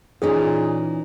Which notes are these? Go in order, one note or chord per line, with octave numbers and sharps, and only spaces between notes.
A#2 E3 C#4 D#4 G#4